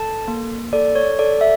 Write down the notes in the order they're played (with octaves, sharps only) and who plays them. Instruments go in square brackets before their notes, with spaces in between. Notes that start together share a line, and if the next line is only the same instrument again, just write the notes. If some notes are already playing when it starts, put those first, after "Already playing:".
Already playing: [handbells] A4 A5
A#3
A4 D5
C#5
A4 D5
E5